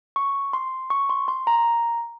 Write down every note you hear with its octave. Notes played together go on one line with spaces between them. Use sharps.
C#6
C6
C#6
C6
C6
A#5